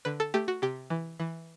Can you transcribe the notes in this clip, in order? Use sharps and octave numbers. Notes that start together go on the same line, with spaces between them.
D3 B4
A4
A3 G4
F#4
C3 G4
E3
E3